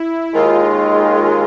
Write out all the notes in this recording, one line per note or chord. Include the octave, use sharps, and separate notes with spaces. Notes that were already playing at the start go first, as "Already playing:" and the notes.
Already playing: E4
D#2 D#3 G#3 F4